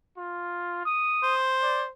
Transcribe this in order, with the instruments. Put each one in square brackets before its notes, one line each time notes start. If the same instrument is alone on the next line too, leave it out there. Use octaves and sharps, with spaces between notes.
[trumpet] F4
D#6
[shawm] C5
[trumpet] D5